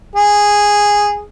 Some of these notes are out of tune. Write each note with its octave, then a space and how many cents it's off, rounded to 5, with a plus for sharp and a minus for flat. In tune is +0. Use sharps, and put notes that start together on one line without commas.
G#4 -10